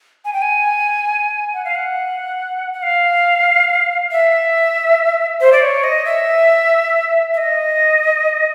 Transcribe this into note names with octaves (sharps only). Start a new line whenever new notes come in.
G#5
G5
G#5
F#5
F5
F#5
F#5
F5
E5
C5
D5
C#5
D#5
E5
E5
D#5